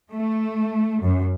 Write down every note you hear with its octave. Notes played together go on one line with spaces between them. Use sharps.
A3
F#2